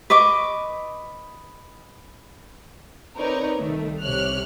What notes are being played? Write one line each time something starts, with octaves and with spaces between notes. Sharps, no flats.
B4 D#5 C#6 D6
C4 D#4 A#4 B4 C#5 D5
C2 D#3 A3
C2 C3 G4 C#5 F6 F#6